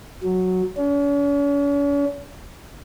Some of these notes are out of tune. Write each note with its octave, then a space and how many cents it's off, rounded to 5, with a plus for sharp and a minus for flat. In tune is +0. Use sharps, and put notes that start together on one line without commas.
F#3 -5
C#4 +45